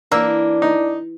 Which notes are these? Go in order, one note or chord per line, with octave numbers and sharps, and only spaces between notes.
E3 A#3 D4 E6
D#4